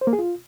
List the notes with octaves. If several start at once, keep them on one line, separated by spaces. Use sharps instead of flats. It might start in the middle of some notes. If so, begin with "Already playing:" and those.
C5
A#3
G#4
F4